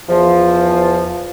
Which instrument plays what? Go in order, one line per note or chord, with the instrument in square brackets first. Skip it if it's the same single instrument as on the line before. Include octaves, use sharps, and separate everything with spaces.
[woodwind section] E2 F3